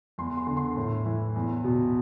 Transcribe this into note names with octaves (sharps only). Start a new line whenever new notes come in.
E2 C6
C6
D3
C6
A2
E3
E2
B2